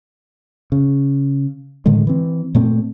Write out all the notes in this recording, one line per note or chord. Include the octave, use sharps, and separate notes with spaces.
C#3
A2 D3 D#3 G#3
E3 C4
A#2 A3 C4